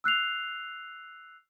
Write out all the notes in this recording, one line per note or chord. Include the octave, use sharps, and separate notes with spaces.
E6 F#6 C7 F7